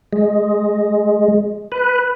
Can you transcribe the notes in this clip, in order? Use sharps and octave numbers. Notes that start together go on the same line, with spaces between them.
G#3
B4